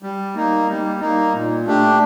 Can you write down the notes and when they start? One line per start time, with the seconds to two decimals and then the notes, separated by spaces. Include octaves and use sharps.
0.03 G3
0.35 A#3 D#4
0.68 G3
1.01 A#3 D#4
1.33 A#2
1.66 A3 D4 G4